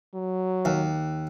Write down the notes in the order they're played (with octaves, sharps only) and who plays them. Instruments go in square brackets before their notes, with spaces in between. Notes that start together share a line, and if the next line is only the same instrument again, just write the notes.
[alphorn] F#3
[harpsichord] D#2